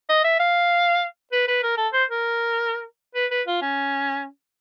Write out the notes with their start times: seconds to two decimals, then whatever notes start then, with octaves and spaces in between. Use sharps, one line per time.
0.09 D#5
0.24 E5
0.40 F5
1.32 B4
1.48 B4
1.63 A#4
1.77 A4
1.93 C5
2.09 A#4
3.15 B4
3.31 B4
3.47 F4
3.62 C#4